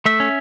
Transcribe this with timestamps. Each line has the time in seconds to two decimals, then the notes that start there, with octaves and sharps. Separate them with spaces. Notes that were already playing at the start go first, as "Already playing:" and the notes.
0.06 A3 E5
0.20 C#4